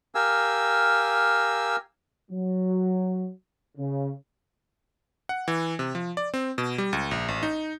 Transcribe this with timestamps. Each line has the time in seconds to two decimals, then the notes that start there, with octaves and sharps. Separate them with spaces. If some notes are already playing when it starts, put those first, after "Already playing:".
0.15 G4 A#4 F5 G#5 E6
2.30 F#3
3.78 C#3
5.29 F#5
5.48 E3
5.79 C3
5.95 F3
6.17 D5
6.34 C4
6.58 B2
6.78 G3
6.93 C#2
7.11 A#1
7.28 A1
7.43 D#4